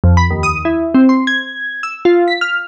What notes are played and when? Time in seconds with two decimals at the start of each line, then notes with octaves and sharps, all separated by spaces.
0.04 F2
0.17 B5
0.31 D#2
0.43 D#6
0.65 E4
0.95 C4
1.09 C6
1.27 G#6
1.83 E6
2.05 F4
2.28 B6
2.41 F6